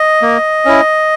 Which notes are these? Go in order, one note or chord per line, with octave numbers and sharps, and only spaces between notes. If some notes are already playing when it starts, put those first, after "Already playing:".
Already playing: D#5
A#3
C#4 E4